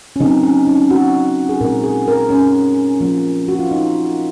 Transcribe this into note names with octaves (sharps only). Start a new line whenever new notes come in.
C#4
C#3 F#3 C4 D#4
C#4
D#4
F#4
G#4
A#2 G#3 C4 A#4
G#4
A#4
C#4
F3 A#3 C#4
F#4
F4
D#4